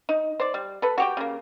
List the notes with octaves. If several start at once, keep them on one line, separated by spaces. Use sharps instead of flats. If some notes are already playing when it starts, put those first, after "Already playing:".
D#4
C5 D5
G3
A4 B4
F#4 G4 G5
C#3 A#3